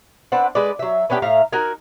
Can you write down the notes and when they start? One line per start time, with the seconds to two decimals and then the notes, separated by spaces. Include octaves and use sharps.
0.32 C4 D4 B4 F#5
0.55 G#3 A3 B4 D5
0.79 F#3 E5
1.10 B3 C#4 D4 G4
1.22 A2 E5 F5 A#5
1.53 D#4 F#4 A#4 G#5